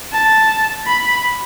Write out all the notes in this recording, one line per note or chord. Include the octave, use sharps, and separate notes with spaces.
A5
B5